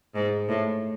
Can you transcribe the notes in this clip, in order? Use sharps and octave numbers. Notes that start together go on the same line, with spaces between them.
G#2
A2